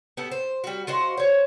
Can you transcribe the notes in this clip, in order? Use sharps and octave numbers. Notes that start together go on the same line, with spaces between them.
B3 G4 A4
C5
G3 F#4
F4 F#4 C5 D#5
C5 C#5